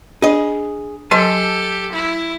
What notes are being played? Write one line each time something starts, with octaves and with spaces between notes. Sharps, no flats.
D4 G#4 D#5
F#3 G4 A4 G#5 A5 C6
E4